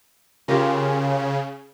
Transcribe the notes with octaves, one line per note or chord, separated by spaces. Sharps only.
C#3 F4 G4 A#4